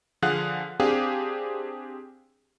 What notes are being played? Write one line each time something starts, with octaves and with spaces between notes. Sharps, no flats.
D3 F3 G#4 F5 F#5 F#6
C4 D4 G4 G#4 F5